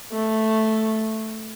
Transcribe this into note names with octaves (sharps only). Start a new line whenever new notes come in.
A3